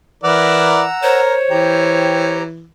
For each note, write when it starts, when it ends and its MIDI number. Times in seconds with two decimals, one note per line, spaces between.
0.23 0.91 52
0.23 0.83 64
0.23 0.83 70
0.23 0.83 74
0.23 1.20 78
0.23 1.20 82
0.23 1.20 88
1.03 1.35 70
1.03 2.40 72
1.03 2.46 73
1.50 2.67 52
1.50 2.43 67
1.50 2.43 79
1.50 2.43 82